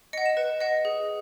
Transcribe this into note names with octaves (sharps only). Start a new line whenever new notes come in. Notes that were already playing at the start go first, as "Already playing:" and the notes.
D#5 F#5 C#7
E7
B4
D#5 F#5
G#4